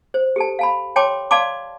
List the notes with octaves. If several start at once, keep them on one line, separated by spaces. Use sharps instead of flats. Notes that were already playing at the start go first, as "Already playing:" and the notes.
C5
G4 A4 A5
F5 A5 B5
C#5 G5 A5 C6 D6
D5 F5 A5 C6 D6